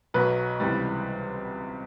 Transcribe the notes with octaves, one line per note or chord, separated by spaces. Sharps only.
B1 B2 F#3 B4
C#2 C3 E3 G3